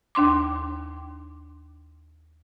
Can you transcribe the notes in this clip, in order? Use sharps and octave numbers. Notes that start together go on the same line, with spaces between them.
D#2 D4 C6 D6